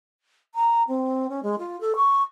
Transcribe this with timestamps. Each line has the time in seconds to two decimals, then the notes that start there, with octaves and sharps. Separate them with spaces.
0.55 A#5
0.88 C4
1.29 C#4
1.43 G#3
1.59 F4
1.81 A4
1.96 C#6